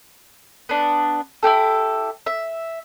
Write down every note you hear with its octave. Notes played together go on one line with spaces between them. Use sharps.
B3 D4
E4 F#4 G4 A4
E5